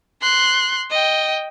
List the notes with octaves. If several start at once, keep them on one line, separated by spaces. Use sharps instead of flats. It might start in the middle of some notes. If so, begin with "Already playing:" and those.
C6 F#6
D#5 G5